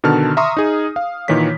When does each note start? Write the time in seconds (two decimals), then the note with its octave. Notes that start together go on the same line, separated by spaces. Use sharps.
0.04 B2 D3 D#3 A5 F6
0.37 E5 A#5 C6 C#6 D#6
0.57 D#4 G#4
0.96 F5
1.28 A#2 D#3 E3 C#5 B6